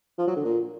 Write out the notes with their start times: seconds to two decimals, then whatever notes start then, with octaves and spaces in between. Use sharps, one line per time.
0.18 F3
0.27 F#3
0.36 D3
0.45 A#2